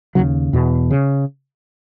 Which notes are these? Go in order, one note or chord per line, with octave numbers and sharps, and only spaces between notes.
D#2 C#3 F#3
E2 B2
C#3